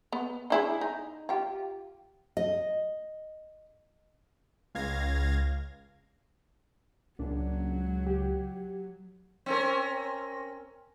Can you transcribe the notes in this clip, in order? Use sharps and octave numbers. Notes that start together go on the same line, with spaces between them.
B3
D4 E4 G#4
D#4
F4 G4
D#5
C#2 F5 G#6 A#6
C#2 A#2 F#3 D4
G4
C4 C#4 A#4